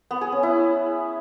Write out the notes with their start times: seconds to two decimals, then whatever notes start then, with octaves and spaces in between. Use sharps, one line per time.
0.11 B3
0.21 G#4
0.32 C#4
0.43 E4